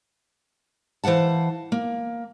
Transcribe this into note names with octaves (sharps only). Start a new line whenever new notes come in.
E3 C5 F5 F#5 A5
A#3